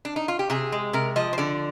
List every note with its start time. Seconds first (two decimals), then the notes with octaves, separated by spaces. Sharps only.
0.05 D4
0.16 D#4
0.28 F4
0.39 G4
0.50 C3 G#4
0.72 G#3
0.93 C3 A#4
1.16 F3 D#5
1.33 C5
1.38 D3 D5